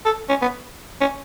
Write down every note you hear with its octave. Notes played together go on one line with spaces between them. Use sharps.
A4
C#4
B3
C#4